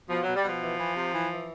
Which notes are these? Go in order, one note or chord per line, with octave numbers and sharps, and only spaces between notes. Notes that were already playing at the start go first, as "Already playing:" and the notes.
B2 F3
B2 F#3
G3
B2 F3
E3
E3
C3
E3
E3